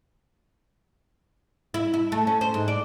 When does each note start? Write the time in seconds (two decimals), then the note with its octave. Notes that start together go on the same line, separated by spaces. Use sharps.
1.74 E4
1.94 E4
2.12 A3
2.27 C#4
2.41 C5
2.54 G#2
2.68 D5